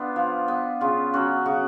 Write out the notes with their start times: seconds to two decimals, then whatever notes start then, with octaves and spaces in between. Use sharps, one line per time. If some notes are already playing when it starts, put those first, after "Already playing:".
Already playing: B3 D4 F4
0.16 F3
0.48 B3
0.81 C#3 F4
1.14 F#3 C#4 F#4
1.46 C#3 F#4